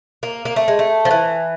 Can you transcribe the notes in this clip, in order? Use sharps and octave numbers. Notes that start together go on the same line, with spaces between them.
A#3
A#3
A3
G#3
A3
F3
E3